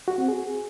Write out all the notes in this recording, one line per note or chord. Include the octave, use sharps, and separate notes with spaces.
F#4
C4
G#4